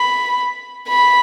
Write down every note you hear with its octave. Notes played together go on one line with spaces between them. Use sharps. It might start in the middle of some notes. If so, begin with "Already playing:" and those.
Already playing: B5
B5